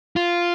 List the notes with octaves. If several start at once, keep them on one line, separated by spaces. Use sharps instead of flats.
F4